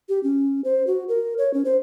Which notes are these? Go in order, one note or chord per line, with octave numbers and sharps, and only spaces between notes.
G4
C#4
C5
F#4
A#4
C#5
C#4
C5